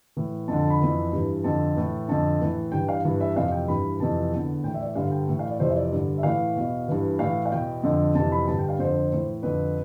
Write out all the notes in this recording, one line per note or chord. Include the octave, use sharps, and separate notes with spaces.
A2 E3
F2 D3 A5
A5
B5
F2 E3
G2 E3
F2 D3 A5
A2 E3
F2 D3 A5
A2 E3
G2 E3 G5
F5
G2 E3
E5
F2 C3 E3 F5
G5
G2 E3 B5
F2 C3 E3 A5
E2 D3
A2 E3 G5
E5
D5
E5
G2 D3 F5
G5
A2 E3
F5
D5
F2 C3 E3 C5
E5
D5
G2 D3
E5
A2 E3 F5
E2 B2
G2 E3
A2 E3 F5
F5
E2 B2 G5
F2 D3
F2 C3 E3 A5
B5
G2 D3 A5
G5
F5
F2 D3 C5
A2 E3
F2 D3 B4